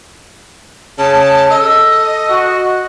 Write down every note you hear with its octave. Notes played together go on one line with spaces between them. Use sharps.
C#3 A5
A4 D#5
F#4